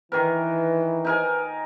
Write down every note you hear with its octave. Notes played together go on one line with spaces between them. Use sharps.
D#3 E3 A#4 B4
D#4 A#4 G#5